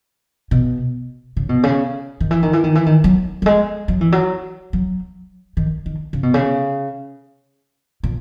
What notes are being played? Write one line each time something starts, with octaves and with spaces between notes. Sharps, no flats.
B2
C#3
B2
C#3
D#3
E3
D#3
E3
D#3
E3
D#3
F#3
F#3
G#3
F#3
E3
F#3
F#3
D#3
D#3
C#3
B2
C#3
A#2